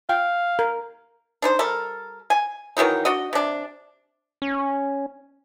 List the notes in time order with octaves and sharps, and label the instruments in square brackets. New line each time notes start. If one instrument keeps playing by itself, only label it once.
[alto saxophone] F5 [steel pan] G5
[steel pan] A#4
[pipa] D4 D#4 C5
G3 A4 A#4
G#5
D#3 E3 F#3 D#4
D4 F#4 D#5
C3 D4
[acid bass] C#4